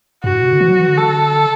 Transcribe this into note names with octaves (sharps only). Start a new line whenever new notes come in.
G2 F#4
A2
C3
D3
E3
F#3
E3
D3
A4